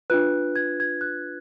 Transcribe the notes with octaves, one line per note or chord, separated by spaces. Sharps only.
D4 F4 B4 F#6
G#6
G#6
F#6